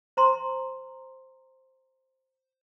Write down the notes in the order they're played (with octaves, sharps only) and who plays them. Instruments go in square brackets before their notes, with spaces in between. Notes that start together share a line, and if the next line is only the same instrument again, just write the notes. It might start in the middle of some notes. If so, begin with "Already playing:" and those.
[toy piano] C5 A#5 C6